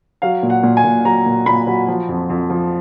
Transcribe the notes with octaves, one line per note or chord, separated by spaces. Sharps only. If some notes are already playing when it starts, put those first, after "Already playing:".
F#3 F5
A#2
F#5
A#2
G#5
A#2
F#3 A#5
A#2
A#2 B5
F#3
F3
F2
F2
F3